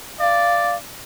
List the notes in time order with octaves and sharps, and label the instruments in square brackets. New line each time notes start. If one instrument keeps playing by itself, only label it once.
[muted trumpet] D5 [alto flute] F5